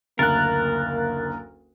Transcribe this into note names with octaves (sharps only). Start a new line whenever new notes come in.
F#1 D2 A#3 A#4 F#6 A6